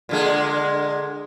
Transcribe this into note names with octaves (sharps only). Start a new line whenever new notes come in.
A#2 D3 G#3